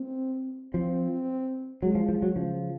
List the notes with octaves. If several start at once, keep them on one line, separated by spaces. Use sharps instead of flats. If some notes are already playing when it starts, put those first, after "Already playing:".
Already playing: C4
F3 C4
F#3 G#3
F3
F3
F#3
C#3 F3